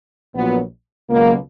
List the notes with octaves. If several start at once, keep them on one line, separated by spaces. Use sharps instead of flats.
A#1 A#2 F#3 B3
C#2 B2 F#3 A#3